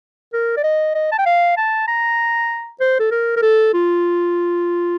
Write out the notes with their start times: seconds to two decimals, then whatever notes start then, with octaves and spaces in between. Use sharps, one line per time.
0.33 A#4
0.57 D5
0.64 D#5
0.94 D#5
1.11 A5
1.18 G5
1.26 F5
1.57 A5
1.87 A#5
2.80 C5
3.00 A4
3.11 A#4
3.36 A#4
3.42 A4
3.73 F4